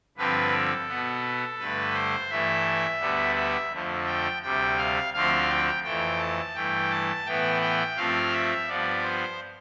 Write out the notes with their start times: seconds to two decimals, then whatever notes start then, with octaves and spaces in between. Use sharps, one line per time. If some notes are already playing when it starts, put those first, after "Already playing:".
0.17 G2 D3 F3 C4 B4
0.52 A4
0.88 B2 B3
1.58 G2 D3 A3 B4
1.94 C5
2.30 G2 E3 A3 E5
3.00 D2 D3 G3 B3
3.35 E5
3.71 F2 D3 F3 A3
4.06 G5
4.42 D2 C3 G3 G5
4.77 F5
5.13 D2 D3 F3 A3 C4 F5
5.49 G5
5.84 F2 E3 A3 G5
6.19 A5
6.55 G2 E3 A3 G5
6.91 A5
7.26 A2 E3 B3 G5
7.62 G5
7.96 G2 F3 A3 C4 F5
8.32 E5
8.68 G2 F3 B3 D5
9.03 C5